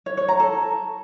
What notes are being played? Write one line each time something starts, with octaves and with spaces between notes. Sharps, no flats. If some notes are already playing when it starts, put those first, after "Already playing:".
C#5
C#5
A#5
A4